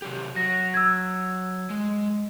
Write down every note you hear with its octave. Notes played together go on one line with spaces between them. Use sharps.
C3 F#3 G4
F#3 A#6
E6 G#6
G#3